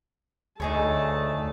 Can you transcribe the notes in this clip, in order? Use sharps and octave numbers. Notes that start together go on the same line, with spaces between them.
D2 A3 D#4 G#4 C#5 A5